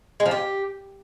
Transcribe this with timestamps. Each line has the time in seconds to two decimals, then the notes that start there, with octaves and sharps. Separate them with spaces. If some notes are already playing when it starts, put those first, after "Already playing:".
0.20 G#3
0.26 F3
0.31 G4